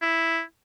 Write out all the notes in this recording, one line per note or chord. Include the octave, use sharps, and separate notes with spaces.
E4